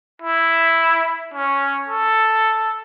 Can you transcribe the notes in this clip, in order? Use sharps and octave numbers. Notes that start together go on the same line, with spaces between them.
E4
C#4
A4